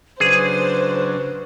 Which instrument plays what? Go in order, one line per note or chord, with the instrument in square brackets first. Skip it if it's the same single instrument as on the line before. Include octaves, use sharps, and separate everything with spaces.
[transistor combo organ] C#3 F#3 D4 [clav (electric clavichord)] G#4 [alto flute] B4 [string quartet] C5